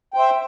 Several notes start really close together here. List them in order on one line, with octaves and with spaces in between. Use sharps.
G5 C5 E5